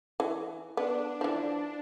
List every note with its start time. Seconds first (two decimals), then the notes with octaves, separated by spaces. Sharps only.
0.20 E3
0.77 B3 D4
1.21 E3 F3